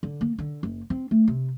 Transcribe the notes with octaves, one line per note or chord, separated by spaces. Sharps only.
D3
A#3
D3
F#1
C4
A3
C3